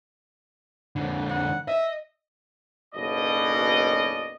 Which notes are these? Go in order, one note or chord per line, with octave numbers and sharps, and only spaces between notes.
F2 D3
F#5
D#5 E5
F#1 B1 B2 D5 D#5